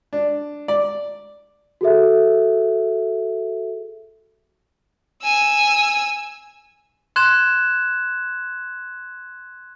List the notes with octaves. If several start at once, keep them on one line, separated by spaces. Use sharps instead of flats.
D4
D5
F#4 G#4 A4 E5
G#5 E6
C6 F#6 G#6 E7